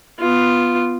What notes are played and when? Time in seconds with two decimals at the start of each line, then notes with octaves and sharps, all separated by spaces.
0.19 B3 F4